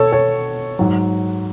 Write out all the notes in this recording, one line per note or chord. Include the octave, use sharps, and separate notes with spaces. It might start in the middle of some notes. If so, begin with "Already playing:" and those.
Already playing: B2 A4 C#5
A4 C#5
G#2 F#3